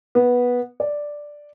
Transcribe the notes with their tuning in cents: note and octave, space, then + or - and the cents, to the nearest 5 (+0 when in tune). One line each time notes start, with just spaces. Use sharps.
B3 -10
D5 +0